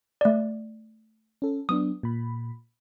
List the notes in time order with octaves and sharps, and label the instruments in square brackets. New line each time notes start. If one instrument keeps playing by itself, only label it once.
[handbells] A3 D5
[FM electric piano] C#4 A4
[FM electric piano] F#3 B3 D4 [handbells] D#6
[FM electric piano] A#2 B5